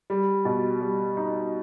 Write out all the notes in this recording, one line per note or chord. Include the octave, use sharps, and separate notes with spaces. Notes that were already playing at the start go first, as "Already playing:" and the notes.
G3
B2
G3
D#4